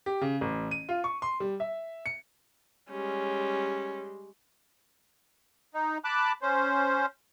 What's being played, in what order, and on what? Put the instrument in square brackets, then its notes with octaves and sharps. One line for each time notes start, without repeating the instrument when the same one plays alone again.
[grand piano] G4
C#3
A1
D#7
F4
C#6
C6
G3
E5
C#7
[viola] G3 G#3 [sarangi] C#4
[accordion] D#4
A5 B5 D6 F#6
C#4 C5